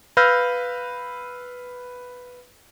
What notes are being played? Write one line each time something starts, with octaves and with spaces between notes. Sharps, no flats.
B4 F5 E6 F6 G6 A#6